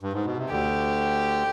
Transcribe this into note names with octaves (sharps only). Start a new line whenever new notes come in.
G2
G#2
B2
C3
D2 D3 G4